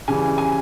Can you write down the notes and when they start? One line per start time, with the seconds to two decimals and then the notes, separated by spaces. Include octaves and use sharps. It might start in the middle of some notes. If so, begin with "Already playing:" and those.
0.08 C#3 E3 G3 G#5
0.38 G#5